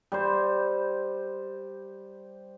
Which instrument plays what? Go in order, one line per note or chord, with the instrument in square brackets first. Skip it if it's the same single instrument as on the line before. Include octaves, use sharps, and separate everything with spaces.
[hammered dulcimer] G3 C5